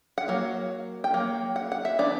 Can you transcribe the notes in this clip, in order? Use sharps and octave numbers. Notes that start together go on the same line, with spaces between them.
F#5
F#3 A#3
G5
F#3 A#3
F#5
F#5
E5
E3 B3 D4 D5